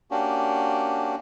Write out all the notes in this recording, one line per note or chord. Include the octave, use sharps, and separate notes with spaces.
A#3 C#4 D4 F#4 G4